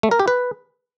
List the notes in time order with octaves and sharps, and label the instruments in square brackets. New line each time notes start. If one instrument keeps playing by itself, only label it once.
[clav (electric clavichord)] A3
A#4
G4
B4